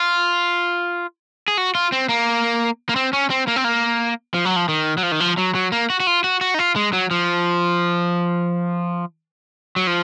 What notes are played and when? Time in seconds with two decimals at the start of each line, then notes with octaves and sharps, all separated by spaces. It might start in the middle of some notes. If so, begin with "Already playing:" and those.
Already playing: F4
1.48 G#4
1.58 F#4
1.75 F4
1.92 C4
2.09 A#3
2.89 A#3
2.96 C4
3.13 C#4
3.30 C4
3.48 A#3
3.56 C4
3.64 A#3
4.34 F3
4.45 F#3
4.56 F3
4.69 D#3
4.98 F#3
5.03 F3
5.12 D#3
5.20 F3
5.38 F#3
5.55 F#3
5.72 A#3
5.90 F#4
6.00 F#4
6.07 F4
6.24 F#4
6.41 F#4
6.54 D#4
6.59 F4
6.76 G#3
6.93 F#3
7.11 F3
9.76 F#3
9.87 F3